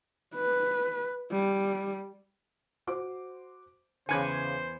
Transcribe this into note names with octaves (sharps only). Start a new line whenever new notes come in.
B4
G3
F#4 C5 D6
E2 C#3 B4 C5 G#5 D6 G#6 C#7